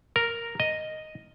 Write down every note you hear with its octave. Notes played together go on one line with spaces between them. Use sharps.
A#4
D#5